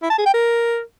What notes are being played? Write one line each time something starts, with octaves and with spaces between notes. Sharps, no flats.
E4
A5
G#4
G5
A#4